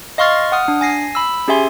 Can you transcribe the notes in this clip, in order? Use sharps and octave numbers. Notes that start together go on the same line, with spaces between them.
D#5 F5 C6 C#6 F6 A6
F#5 D#6 F6
D4
G#5 A#6 C7
B5 E6
C#4 G4 G#4 E5 G#5 C6